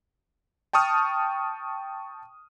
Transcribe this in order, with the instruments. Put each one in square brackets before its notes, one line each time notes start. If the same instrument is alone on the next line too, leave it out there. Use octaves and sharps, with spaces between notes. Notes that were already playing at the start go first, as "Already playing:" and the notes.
[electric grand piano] G5 A5 C#6 D#6 F6